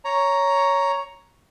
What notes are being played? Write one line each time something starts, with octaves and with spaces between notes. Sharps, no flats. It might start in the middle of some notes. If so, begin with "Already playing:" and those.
C#5 A#5